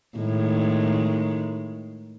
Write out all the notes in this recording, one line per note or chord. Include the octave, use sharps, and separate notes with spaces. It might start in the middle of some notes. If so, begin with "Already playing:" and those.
A2 D#3 G#3